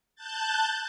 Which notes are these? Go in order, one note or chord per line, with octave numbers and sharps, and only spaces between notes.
A5 F#6 G6 A6